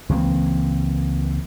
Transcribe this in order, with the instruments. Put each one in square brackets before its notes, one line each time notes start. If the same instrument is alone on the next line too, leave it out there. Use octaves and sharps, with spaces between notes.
[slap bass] C#2 E3 A#3 C4